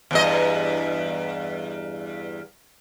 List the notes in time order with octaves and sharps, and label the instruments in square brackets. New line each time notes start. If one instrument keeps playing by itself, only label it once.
[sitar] E2 G2 D#5